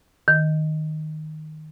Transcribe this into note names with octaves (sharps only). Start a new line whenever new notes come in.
D#3